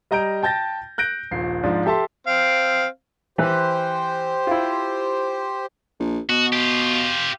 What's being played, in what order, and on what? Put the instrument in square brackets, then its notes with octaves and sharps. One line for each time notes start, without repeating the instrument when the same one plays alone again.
[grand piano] G3 D#5 A#5 G6 D7
G5 A5 G6 A6 A#6
F#6 G6 A#6 D7
D#1 A#1 C7
G#2 F3 D4
G4 A4 E5 A5 C6
[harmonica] C4 F5
[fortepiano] E3 B4 [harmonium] G4 C5
[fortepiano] E4 F4
[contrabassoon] A#1
[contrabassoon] B2 [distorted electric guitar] F#4
[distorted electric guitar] F4 G4